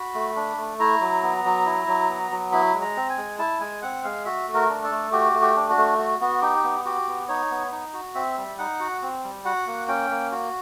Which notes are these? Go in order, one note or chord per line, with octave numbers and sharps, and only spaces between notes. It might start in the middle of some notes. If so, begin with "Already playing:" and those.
Already playing: F#4 B5
A3
D4
A3
E4 A#5
F#3
B3
F#3
E4
F#3
B3
F#3
E4 B5
G#3
A#5
C4
G#5
G#3
E4 A5
G#3 G#5
C4 F#5
G#3 F5
F#4 E5
A3
A#4
D4
A4
A3
F#4 G4
A3
G4
D4
F#4
A3
F#4
B3 F#4
D#4 G4
B3
F#4 G4
B3
D#4 C#5
B3
D#4
F#4
C4 E5
G3
D#4 F#5
F#4
C4
G3
F#4 F#5
A#3
C#4 G5
A#3
F#4